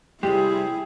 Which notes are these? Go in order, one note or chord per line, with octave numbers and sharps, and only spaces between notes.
C3 G3 G#3 E4 G4 G#4